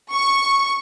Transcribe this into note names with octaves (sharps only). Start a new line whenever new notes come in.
C#6